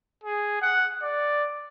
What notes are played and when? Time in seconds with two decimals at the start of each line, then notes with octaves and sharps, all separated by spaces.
0.23 G#4
0.62 F#5
1.02 D5